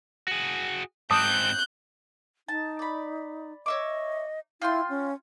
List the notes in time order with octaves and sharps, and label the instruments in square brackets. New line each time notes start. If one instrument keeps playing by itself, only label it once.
[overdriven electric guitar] F#4 G#4
[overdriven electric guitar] G#2 C4 [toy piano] A5 D6 D#6 [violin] F#6 G6
[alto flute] D#4 [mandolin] A5
[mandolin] D5 B5
[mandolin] C#5 E5 D6 [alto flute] D#5
[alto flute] E4 [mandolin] F4 G5 C6
[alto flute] C#4